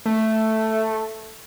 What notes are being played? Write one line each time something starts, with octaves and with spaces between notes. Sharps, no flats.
A3